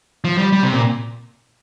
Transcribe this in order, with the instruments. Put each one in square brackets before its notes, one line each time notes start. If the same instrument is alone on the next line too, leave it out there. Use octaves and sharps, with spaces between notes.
[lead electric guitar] F3
G3
G3
C3
A#2